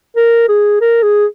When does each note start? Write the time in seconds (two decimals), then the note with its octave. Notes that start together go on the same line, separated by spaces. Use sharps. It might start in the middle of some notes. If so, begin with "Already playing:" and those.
0.17 A#4
0.49 G#4
0.81 A#4
1.03 G#4